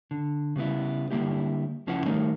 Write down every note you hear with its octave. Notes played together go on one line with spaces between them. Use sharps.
D3
C#3 G3 B3 E4
D3 G3 A#3 E4 G4
C#2 F3 C#4 E4 B4 F#5
D#3 G3 A3 D#4 A#4 C#5